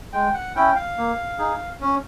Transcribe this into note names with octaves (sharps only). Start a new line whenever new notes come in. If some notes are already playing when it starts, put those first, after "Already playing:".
G#3 G5
F#5
C#4 E4 G5
F5
A#3
D#4 G#4
C#4